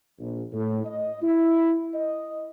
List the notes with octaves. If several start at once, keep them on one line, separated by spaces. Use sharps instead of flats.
A#1
A2
D#5
E4
D#5